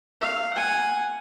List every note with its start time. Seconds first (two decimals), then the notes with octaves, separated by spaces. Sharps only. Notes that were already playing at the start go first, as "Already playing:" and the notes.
0.21 F5
0.54 F#5 G#5